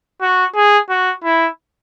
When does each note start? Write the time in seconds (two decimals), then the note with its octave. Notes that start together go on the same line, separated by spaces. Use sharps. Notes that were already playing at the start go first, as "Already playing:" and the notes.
0.21 F#4
0.55 G#4
0.90 F#4
1.24 E4